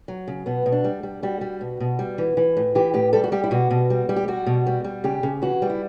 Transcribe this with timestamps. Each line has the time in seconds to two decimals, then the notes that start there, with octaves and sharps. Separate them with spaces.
0.08 F#3
0.28 C#3
0.46 B2 B3
0.66 B2
0.72 D4
0.84 G3
1.03 G3
1.23 G3 F#4
1.41 G3
1.61 B2
1.80 B2
1.99 G3
2.18 E3
2.37 E3
2.57 A2
2.75 E3 G4
2.94 A2 G4
3.13 G3 A4
3.24 F#4
3.32 G3 G4
3.44 E4
3.51 B2 F#4
3.71 B2
3.90 G3
4.09 G3
4.16 G4
4.28 G3 F#4
4.46 B2
4.67 G3
4.84 G3
5.04 C#3 G4
5.23 C#3
5.42 E3 F#4
5.62 G3
5.70 E4